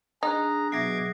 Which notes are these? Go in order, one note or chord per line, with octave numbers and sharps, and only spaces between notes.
D4 D#4 G#4 A#5 D#6 F#6
B2 F#3 G#4 E5 D6 G#6 A#6 C7